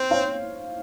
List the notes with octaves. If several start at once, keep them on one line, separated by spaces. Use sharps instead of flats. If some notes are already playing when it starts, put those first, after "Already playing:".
Already playing: C4 C5
C#5 F5